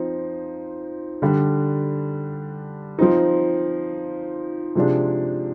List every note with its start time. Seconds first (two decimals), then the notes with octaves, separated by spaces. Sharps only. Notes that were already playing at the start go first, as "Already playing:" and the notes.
Already playing: F3 C4 D#4
1.22 D3 G3 D4
2.99 F3 C4 D#4
4.75 C3 F3 G#3 D4